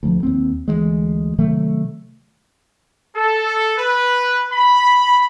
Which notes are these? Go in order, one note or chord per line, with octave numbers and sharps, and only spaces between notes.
D2 E3 F3
D#2 A#3 C4
D2 E3 F#3 G#3
C3 D#3 F#3 A3
A4
B4
B5